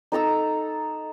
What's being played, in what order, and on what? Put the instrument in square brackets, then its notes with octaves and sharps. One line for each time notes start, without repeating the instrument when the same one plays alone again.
[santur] D#4 A4 A#5 E6